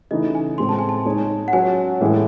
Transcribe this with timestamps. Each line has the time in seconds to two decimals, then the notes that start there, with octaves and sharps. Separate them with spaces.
0.11 C#3 E3 A3 D#4 D#5
0.35 G#5
0.58 A2 G#3 C4 C6
0.69 A5
0.79 G#5
0.89 A5
1.06 G#3 D#4 G#4 C#5
1.48 F#5
1.53 F#3 C#4 F#4 C#5 G#5
2.01 A2 E3 G#3 C#4 G#4